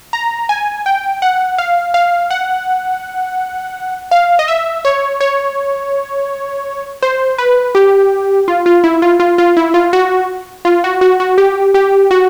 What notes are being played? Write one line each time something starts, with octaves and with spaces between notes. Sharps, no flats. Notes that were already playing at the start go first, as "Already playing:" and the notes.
A#5
G#5
G5
F#5
F5
F5
F#5
F5
D#5
E5
C#5
C#5
C5
B4
G4
F4
F4
E4
F4
F4
F4
E4
F4
F#4
F4
F#4
F#4
F#4
G4
G4
F#4